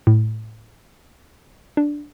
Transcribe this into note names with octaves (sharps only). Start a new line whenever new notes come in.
A2
D4